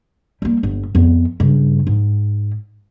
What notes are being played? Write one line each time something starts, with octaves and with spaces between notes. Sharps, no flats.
G3 A#3
G1
F2 B3
G2 C#3
G#2